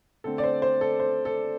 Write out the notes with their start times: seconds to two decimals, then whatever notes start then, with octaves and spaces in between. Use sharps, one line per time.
0.24 D3 A3 C4 A4
0.38 D5
0.44 C5
0.62 C5
0.81 A4
1.00 C5
1.25 A4